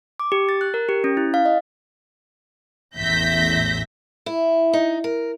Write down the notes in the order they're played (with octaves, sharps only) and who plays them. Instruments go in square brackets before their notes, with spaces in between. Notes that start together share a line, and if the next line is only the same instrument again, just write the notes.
[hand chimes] D6
G4
A6
F#6
A#4
G4
C#4
E4
F5
D#5
[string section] A1 E2 E5 G6 A#6 B6
[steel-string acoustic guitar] E4
D#4
A#4